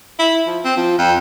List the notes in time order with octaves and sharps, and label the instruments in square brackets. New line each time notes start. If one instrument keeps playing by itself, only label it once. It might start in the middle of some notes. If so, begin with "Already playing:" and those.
[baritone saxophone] E4
F3
C4
F3
F2